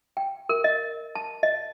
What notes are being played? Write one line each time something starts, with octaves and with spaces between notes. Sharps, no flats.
G5
A#4
D#5
A5
D#5